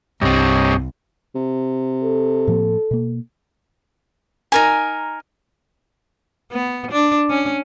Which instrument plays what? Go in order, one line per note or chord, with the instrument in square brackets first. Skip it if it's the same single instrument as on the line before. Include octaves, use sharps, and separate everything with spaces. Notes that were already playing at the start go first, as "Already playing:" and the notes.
[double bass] C2 [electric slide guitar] G2 C4 [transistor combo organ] G4 C#5 D#5
[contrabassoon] C3
[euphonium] A4
[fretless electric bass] A2 F3 A#3
B2 A#3
[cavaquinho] D#4 A#4 G#5
[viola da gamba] B3
D4
C#4